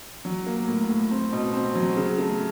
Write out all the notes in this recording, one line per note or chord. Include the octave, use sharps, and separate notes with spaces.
F#3
A#3
A2
A2
C4
B2
C4
F#3
C#3
A3